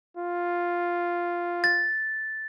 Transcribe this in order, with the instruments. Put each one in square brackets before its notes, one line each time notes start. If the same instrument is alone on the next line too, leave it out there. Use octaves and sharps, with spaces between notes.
[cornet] F4
[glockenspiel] A6